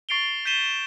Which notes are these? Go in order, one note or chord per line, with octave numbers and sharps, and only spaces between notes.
C#6 A6 C7 D7 F7 G7
G6 B6 C7 D#7 E7 G7